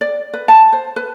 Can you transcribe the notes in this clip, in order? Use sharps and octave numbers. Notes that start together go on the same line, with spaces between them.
D5
B4
A5
C5
B4